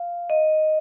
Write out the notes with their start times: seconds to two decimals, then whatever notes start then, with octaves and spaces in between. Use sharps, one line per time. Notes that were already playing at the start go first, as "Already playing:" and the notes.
Already playing: F5
0.30 D#5